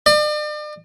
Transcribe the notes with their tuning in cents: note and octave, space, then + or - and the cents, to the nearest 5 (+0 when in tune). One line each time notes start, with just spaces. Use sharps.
D5 +40